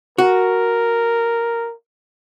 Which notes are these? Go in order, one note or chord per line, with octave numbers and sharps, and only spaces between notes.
F#4 A#4